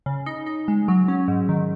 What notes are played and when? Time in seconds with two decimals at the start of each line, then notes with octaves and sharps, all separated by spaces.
0.06 C#3
0.26 D#4
0.46 D#4
0.68 G#3
0.88 F#3
1.08 C#4
1.28 G#2
1.49 D#3